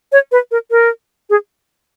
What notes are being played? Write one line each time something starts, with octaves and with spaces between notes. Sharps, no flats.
C#5
B4
A#4
A#4
G#4